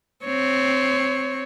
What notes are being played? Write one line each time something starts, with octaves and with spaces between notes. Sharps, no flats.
C4 C#5